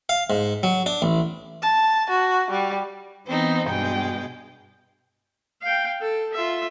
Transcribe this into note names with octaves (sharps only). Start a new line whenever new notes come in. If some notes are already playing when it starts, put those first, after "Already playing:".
F5
G#2
F#3
D4
A1
A5
F#4
G3
E3 B3 C4 D#4
G2 B2 G#3 G5
F5 G5
A4
F4 E5